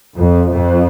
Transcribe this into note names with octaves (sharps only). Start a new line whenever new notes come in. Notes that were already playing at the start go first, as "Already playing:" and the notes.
F2
F2